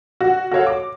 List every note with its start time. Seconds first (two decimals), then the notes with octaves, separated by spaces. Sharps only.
0.21 F#4
0.51 F#4 A4 C#5 F5
0.67 D6